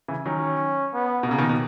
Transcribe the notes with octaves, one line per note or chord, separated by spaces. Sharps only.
C#3 E3
D#3 F#3 C#4
B3
B2
C#3 A#3
B2 D#3
B2